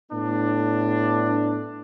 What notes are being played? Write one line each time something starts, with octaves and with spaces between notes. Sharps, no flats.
A2 B3 D4